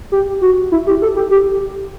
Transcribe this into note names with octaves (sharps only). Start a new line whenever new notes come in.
G4
F#4
E4
G4
A4
G4
G4